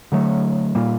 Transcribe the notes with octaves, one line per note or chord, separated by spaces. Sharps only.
D3 F#3 A3
A#2 G3 A#3